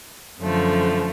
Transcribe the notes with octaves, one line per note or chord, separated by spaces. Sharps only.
F#2 D3 F3 A3